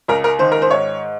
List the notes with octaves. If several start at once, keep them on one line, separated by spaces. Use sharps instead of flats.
C#2 A#4
A#4
D#3 C5
A#4
C5
G#2 C#5